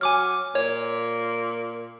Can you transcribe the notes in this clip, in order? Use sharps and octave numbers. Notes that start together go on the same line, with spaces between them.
F#3 G#5 D6 F6
A#2 C#5